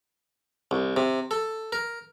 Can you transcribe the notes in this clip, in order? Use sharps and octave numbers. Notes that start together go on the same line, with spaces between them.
C2
C3
A4
A#4